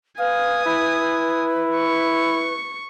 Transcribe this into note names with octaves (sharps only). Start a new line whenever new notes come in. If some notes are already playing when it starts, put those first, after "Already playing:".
B4 F5 G#5 D#6
E4
C#6